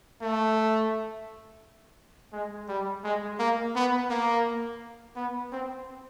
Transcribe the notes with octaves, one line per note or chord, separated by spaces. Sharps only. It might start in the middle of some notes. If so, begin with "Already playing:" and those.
A3
G#3
G3
G#3
A#3
B3
A#3
B3
C4